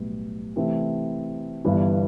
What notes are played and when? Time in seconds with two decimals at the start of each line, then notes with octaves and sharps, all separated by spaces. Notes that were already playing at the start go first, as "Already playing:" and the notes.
Already playing: B1 A2 G3 B3 E4
0.56 C3 E3 A3 C4
1.65 G1 G2 E3 B3